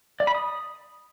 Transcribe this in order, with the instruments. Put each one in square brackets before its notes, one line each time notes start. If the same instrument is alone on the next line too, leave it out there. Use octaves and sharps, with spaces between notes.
[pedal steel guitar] D5
B5
D#6